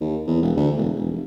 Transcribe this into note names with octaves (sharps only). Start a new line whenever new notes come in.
D#2
E2
E1
D2
E1
E1
F1